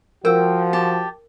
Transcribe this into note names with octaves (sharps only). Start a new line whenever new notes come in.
F3 F#4 A#4 G5 E6
G4 A5